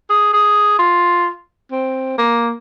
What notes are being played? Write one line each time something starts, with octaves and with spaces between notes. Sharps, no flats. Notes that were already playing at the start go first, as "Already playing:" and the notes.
G#4
G#4
F4
C4
A#3